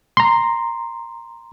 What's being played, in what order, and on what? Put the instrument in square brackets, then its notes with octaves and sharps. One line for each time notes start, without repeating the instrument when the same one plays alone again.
[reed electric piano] A#5 C6